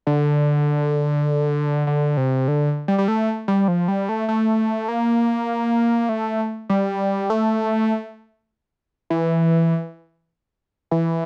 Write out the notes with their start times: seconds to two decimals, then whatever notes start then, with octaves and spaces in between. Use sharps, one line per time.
0.07 D3
1.87 D3
2.17 C3
2.48 D3
2.88 G3
2.98 G3
3.08 A3
3.48 G3
3.68 F3
3.88 G3
4.09 A3
4.28 A3
4.88 A#3
6.09 A3
6.69 G3
7.30 A3
9.10 E3
10.91 E3